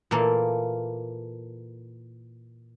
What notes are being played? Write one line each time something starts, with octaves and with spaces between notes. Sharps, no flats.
A#2 E3 A#3 A4